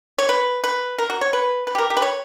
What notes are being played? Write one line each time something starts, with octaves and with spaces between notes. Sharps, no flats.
C#5
B4
B4
A#4
F#4
C#5
B4
B4
G4
A#4
G4
B4
C#5